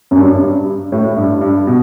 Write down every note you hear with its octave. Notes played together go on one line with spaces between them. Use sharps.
F#2
G2
G2
A2
G2
G2
B2